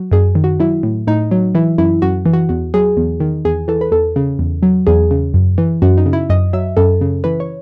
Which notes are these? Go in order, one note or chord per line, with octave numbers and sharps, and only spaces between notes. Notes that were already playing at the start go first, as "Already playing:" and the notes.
Already playing: F#3
F#2 G#4
D#3
F#4
F#3 E4
A2
A2 D#4
F#3
E3 E4
F#2 E4
F#2 F#4
E3
F#4
E2 F#4
F#3 G#4
E2
D#3
E2 G#4
E3 A4
B4
E2 A4
C#3
E2
F#3
E2 G#4
C#3
F#2
E3
F#2 F#4
D#4
C#3
E4
F#2 D#5
F#3 E5
F#2 A4
C#3
E3 B4
C#5